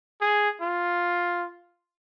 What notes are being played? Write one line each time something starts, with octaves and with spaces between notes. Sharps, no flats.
G#4
F4